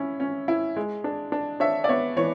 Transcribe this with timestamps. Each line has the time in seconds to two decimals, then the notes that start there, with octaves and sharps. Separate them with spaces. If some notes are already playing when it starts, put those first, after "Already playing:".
Already playing: C#4 E4
0.20 C#4
0.48 E4
0.76 G#3
1.04 D4
1.32 D4
1.60 D4 C#5 E5
1.84 D5
1.89 B3 C#5 E5
2.16 E3 C#5